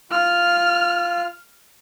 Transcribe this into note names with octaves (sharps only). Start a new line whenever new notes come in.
F4 F6